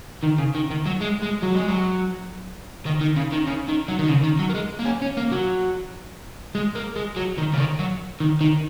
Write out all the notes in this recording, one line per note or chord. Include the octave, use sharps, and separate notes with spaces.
D#3
C#3
D#3
D#3
F#3
G#3
G#3
F#3
G#3
F#3
D#3
D#3
C#3
D#3
C#3
D#3
F#3
D#3
C#3
D#3
F#3
A#3
G#3
A#3
C#4
C#4
A#3
F#3
G#3
A#3
G#3
F#3
D#3
C#3
D#3
F#3
D#3
D#3